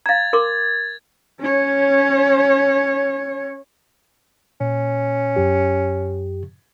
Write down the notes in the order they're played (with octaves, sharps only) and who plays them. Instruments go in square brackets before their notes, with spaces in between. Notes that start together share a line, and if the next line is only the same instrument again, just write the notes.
[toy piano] F5 A#5 [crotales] G#6 A6
[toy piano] A#4 C6 D6
[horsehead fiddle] C#4 C#5
[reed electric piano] A#2 [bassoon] C#4
[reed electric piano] F#2 G4